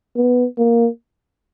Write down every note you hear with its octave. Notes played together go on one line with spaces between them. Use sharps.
B3
A#3